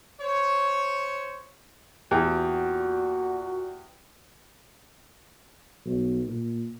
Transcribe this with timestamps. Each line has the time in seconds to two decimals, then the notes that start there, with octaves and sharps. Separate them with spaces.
0.21 C5 C#5
2.11 E2 A#2 F#4 G4
5.85 B1
6.27 A#2